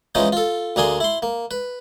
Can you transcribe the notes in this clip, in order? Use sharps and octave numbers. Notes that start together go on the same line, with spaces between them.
E3 F3 G#3 C#4 D#4
F4 A4
D2 A#3 D4 G#4 G#5 C6
E4 C6
A#3
B4